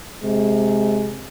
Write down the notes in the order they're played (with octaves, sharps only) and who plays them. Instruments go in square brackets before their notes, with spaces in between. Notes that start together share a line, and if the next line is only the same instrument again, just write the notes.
[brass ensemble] C3 G#3